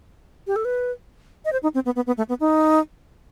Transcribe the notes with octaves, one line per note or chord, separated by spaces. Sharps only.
G4
A4
B4
D#5
C5
D#4
C4
B3
B3
B3
A3
B3
D#4